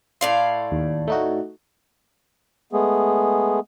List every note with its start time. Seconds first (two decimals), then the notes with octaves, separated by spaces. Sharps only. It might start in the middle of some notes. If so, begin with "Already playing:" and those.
0.21 A2 D5 F5 C6
0.72 D#2
1.08 A3 D#4 F#4
2.73 G#3 A3 B3 G#4